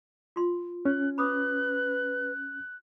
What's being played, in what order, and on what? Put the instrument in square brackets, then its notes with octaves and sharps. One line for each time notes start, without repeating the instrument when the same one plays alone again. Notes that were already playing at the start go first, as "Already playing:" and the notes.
[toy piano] F4 C6
[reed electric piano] C#4 [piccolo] F#6
[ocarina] B4 [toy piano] B5 D6 D#6 [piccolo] F#6